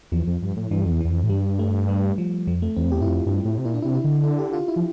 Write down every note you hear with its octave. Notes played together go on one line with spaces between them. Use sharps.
E2 F3
F2
G2
A2
G2 E3
F2
E2
E3
E2
F2
A2
G2 G3
A3
G3
F3
F2 F3
A3
E2 C4
F2
E2 G4
G2 E4
F2 F4
G2
A2
C3
A#2 E4
D4
C3 E4
E4
D3
E4
G4
F4
E4
F3